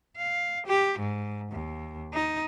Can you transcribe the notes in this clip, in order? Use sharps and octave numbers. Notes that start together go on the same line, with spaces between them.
F5
G4
G#2
D#2
D#4